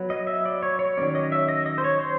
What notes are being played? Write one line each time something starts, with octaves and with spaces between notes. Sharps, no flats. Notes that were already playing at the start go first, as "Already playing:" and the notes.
Already playing: F#3 B3
D#5
E5
D5
C#5
C#5
D#3 F#3 A#3 C#4 D5
D#5
E5
D#5
D#5
C5
C#5
C5